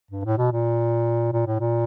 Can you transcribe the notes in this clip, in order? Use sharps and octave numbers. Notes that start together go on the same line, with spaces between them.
G2
A2
B2
A#2
A#2
A2
A#2